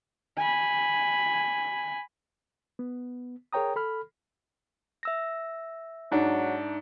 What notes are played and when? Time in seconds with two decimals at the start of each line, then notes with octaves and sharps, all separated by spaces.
0.38 G#5 B5
2.79 B3
3.53 G#4 A#4 C#5 G5 A#5 D#6
3.76 A4 B5 F6
5.03 E5 E6 A#6
6.12 G#2 F#3 D4 D#4